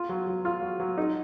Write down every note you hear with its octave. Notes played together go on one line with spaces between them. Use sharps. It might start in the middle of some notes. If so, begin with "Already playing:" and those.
Already playing: F4
F#3
F#3
F4
F#3
F#3
D#4